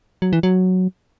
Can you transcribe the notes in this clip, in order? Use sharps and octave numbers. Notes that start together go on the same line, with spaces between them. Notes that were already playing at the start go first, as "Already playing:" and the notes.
F#3
E3
F#3